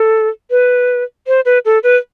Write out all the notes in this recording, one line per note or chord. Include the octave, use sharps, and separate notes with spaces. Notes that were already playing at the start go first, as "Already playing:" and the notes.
Already playing: A4
B4
C5
B4
A4
B4